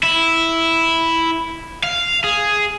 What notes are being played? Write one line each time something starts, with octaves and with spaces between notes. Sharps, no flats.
E4
F5
G#4